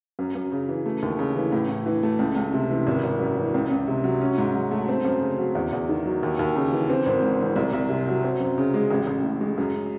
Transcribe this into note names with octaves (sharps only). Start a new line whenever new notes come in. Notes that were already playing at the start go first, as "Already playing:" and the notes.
F#2
F#2
C#3
E3
A3
D#2
C#3
E3
A2
A2
E3
A3
C#2
C#2
C3
E3
G#1
G#1
F#2
E3
C#2
C#2
C3
F#3
C#4
G#2
F#3
A3
C4
F#2
C#3
F#3
E2
E2
D#3
F#3
D#2
D#2
C#3
E3
C4
G#1
G#2
E3
C2
C2
C3
F#3
C4
F#2
C#3
G#3
A1
A1
A2
G#3
F#2